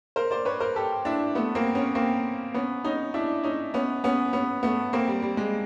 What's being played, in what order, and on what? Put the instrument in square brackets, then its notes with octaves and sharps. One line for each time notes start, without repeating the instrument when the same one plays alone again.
[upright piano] A#4 C5
C5 D5
B4 C#5
A#4 C5
G4 A4
D4 E4
A3 B3
A#3 C4
B3 C#4
A#3 C4
B3 C#4
C#4 D#4
D4 E4
C#4 D#4
B3 C#4
B3 C#4
B3 C#4
A3 B3
A#3 C4
G3
G3
G#3